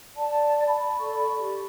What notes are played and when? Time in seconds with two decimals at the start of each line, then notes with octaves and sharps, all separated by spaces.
0.16 D5 A5
0.65 B5
1.00 A4 D5 B5 C#6
1.38 G4